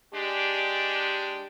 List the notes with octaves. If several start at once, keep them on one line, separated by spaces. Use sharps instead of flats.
G#3 D4 G4